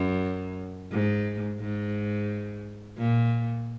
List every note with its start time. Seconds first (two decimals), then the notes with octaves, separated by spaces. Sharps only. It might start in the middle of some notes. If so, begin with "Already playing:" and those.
Already playing: F#2
0.91 G#2
1.60 G#2
2.98 A#2